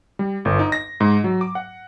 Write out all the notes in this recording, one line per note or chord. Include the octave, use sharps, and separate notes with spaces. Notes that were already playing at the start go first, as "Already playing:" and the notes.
G3
G1
D#4
A#6
G#2
F#3
D6
F#5